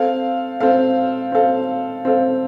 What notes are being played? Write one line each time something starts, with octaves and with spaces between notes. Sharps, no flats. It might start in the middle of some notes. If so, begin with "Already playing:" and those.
Already playing: C4 A4 F5
C4 A4 F5
C4 A4 F5
C4 A4 F5